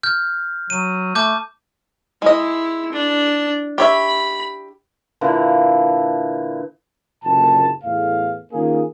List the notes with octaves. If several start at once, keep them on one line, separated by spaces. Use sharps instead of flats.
F6 G6
F#3 D#7
A3 A5 D6 G6
G#3 E4 D#5
D4
G4 C#5 E5 B5
A#2 D3 E3
F#1 A#2 D3 A5
E2 A2 F5
D#3 A#3 C#4 F4 G#4